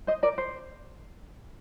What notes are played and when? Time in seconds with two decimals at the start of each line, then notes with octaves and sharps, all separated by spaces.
0.07 C5 D#5
0.23 A#4 D5
0.38 C5